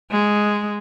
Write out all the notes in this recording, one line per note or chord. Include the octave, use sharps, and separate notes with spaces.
G#3